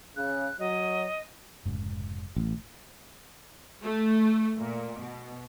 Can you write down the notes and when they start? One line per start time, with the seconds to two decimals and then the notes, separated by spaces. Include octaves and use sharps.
0.16 C#3 F#6
0.59 F#3 D#5
1.65 F1 G#2 C#3
2.36 A1
3.83 A3
4.57 A#2
4.98 B2